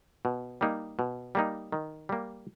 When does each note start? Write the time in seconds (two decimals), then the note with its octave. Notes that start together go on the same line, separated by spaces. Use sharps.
0.25 B2
0.61 G3 A#3 D#4
0.99 B2
1.35 G3 A#3 D#4
1.72 D#3
2.09 G3 A#3